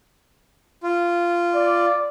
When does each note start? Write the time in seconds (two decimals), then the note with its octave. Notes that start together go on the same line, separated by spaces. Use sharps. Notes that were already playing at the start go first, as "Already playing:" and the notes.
0.83 F4
1.54 D5